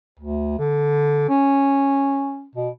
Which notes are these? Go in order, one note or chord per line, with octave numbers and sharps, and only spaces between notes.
D2
D3
C#4
B2